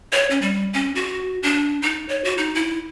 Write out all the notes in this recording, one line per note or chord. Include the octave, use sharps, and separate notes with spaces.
C#5
C#4
G3
C#4
F#4
D4
D#4
C#5
F#4
D#4
E4